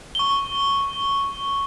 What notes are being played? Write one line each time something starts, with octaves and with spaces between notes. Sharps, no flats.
C#6 G7